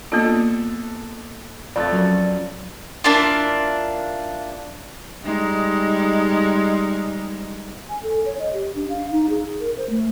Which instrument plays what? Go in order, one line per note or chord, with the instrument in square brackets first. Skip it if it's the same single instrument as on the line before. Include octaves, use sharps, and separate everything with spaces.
[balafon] A#3 B3 F4 [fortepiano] D4 A4 D#5
[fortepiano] F2 A3 [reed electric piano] D5 A6 [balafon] F5
[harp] F#3 C#4 A#4
[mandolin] A#3 D4 E4 F4
[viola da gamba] G3 G#3 D#4
[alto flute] G#5
A4
C#5
D#5
G4
D4
F5
D#4
G#4
A#4
C5
A3